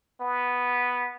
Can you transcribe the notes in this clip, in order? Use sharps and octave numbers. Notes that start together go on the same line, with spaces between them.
B3